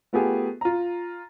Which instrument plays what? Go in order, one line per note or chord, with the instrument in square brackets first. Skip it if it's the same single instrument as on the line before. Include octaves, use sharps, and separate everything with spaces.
[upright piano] A3 B3 F4 G4 G#4
F4 A#5